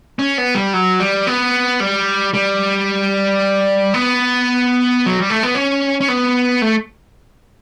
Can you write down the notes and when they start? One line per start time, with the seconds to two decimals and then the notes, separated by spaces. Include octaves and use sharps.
0.19 C#4
0.38 B3
0.55 G3
0.73 F#3
1.00 G3
1.27 B3
1.80 G3
2.34 G3
3.94 B3
5.06 F#3
5.18 G3
5.30 A3
5.43 B3
5.55 C#4
6.01 C#4
6.08 B3
6.62 A3